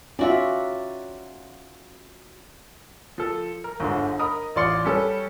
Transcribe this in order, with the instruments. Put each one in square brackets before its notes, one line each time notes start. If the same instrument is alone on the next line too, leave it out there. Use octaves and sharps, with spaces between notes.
[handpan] C#4 D#4 E5 [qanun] F4 F#4 D5
[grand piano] F3 A4
A#4
G1 G#2 D3
A#4 D#5 B5 D#6
A1 F4 D5 C6 C#7
G3 C#4 A4 B4